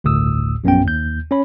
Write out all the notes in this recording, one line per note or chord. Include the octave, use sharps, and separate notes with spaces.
G1 D2 A2 D#6 E6
A#1 F#2 B3 C#4 G5
D#2 G6
C#4 C#5 B5